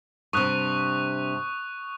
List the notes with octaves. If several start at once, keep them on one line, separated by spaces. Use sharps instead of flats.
G2 C3 C#6 D#6 F#6